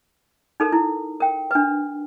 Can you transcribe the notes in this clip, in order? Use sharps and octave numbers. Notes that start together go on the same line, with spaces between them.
D#4 A4 A#4
E4
A#4 G5
D4 B4